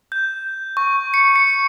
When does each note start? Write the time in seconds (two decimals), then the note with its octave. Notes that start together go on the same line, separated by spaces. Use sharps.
0.12 G6
0.77 C#6
1.14 C#7
1.36 C#7